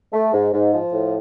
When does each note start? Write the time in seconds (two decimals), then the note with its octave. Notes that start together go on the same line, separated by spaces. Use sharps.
0.13 A3
0.34 G#2
0.53 G#2
0.73 F3
0.93 A2